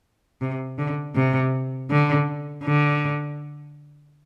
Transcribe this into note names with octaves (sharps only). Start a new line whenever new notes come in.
C3
D3
C3
D3
D3